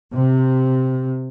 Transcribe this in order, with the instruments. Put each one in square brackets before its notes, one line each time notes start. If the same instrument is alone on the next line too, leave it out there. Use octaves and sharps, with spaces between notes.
[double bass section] C3